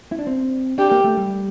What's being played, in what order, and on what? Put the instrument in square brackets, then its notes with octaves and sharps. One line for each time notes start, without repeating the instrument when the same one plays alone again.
[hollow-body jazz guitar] E4
D4
C4
[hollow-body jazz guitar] D4 [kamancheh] G4
[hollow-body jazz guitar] A#3
A3
G3